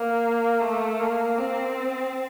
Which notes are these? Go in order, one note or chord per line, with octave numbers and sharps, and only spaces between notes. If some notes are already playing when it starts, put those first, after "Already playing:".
Already playing: A#3
A3
A#3
C4